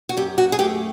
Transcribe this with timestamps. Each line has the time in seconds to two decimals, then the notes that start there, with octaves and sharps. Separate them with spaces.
0.09 F#4
0.17 F#2 G4
0.38 F#4
0.52 G#4
0.59 A3 G4